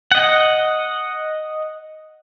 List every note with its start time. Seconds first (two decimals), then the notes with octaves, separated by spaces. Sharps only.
0.12 D#5 F#5